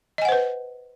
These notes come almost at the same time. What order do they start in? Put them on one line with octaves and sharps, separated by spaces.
D#5 G#5 F#5 C5 B4